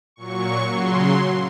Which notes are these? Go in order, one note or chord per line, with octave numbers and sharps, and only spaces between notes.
A#2 F#3 C#6
C#3 F#3 C6